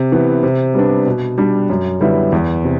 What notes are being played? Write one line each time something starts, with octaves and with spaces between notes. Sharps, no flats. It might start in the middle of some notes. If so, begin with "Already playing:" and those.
Already playing: C3
E3 B3
C3
G3 B3 D4
B2
G3 D4
F#2
D3 G3 B3 E4
E2
C3